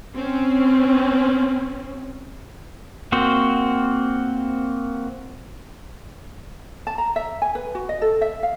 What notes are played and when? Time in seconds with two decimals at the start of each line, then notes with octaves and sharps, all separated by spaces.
0.15 C4 C#4
3.12 A#3 C4 F#4 C5
6.87 A5
6.98 A#5
7.16 E5
7.42 G#5
7.55 B4
7.75 F#4
7.89 D#5
8.02 A4
8.21 E5
8.43 F5